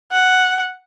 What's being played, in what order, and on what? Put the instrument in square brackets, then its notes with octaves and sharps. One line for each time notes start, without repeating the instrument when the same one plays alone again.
[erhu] F#5